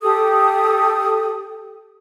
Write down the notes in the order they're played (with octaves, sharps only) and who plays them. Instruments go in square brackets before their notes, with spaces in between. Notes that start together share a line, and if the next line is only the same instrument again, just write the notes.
[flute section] G4 A4 D#6